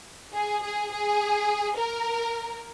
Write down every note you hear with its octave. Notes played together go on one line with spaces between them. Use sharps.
G#4
G#4
G#4
A#4